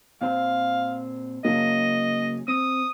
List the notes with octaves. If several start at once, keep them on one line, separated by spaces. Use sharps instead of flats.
A#2 C4 C5 F5
C#3 F#3 A#3 D#5
C4 D#6